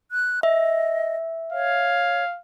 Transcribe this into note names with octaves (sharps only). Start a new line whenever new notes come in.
F#6
D#5 E5
C#5 F5